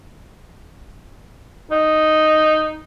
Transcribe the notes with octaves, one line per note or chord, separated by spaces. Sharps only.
D#4